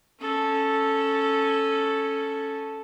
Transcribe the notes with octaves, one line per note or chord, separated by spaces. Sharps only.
C#4 A4